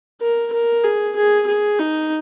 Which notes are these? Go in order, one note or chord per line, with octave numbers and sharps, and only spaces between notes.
A#4
A#4
G#4
G#4
G#4
D#4